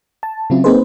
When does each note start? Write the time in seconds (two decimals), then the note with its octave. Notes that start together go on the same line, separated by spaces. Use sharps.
0.23 A5
0.50 C#3 F#3 C4 E4 F4
0.64 A#3 C4 D#4 G#4 B4 C5